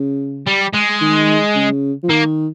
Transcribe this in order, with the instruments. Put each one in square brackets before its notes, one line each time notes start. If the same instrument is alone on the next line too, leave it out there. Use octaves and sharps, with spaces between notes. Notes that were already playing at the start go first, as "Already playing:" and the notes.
Already playing: [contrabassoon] C#3
[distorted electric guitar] G3
G#3
[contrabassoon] D#3
C#3
F3
[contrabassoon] D#3 [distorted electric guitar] A#3